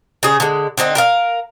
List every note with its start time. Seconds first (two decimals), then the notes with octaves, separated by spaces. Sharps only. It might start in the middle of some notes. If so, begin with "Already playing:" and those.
0.23 C#3 G#4
0.40 D3 G#3
0.78 D3 C4 C#4 D#4
0.95 A#4 B4 F5